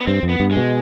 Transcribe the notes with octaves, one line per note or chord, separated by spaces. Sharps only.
B3
G2 C4
F2
B3
G2
G#3
B2